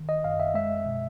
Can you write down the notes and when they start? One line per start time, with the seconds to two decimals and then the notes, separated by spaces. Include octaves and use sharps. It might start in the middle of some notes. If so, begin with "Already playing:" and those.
Already playing: D#3
0.09 D#5
0.24 F#2 F5
0.40 E5
0.54 G#3 E5
0.86 B2